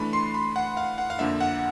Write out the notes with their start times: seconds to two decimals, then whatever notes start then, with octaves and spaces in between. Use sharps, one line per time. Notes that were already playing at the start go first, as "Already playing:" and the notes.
Already playing: E3 A3 D4 B5
0.13 C6
0.34 B5
0.56 F#5
0.77 F5
0.98 F#5
1.10 F5
1.19 F2 D3 F3 A#3 D4 E5
1.40 F#5